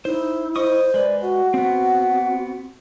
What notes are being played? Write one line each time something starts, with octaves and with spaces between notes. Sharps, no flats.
D#4 E4 C5
C5 D#5 C#6 D#6
G#3 B4 D5
F#4 F#5
B3 C4 F#4